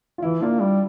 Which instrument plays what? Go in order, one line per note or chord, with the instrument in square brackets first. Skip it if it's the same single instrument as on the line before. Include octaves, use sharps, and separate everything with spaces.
[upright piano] F4
[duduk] E3 [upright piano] E4
[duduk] A#3 [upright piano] D4 F4
[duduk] G3